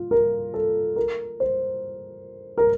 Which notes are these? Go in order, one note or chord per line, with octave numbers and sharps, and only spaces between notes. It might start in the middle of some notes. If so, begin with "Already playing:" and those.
Already playing: F4
A#4
A4
A#4
C5
A#4